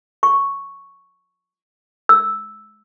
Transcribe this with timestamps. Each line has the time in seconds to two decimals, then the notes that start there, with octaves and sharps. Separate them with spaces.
0.23 C#6
2.09 E6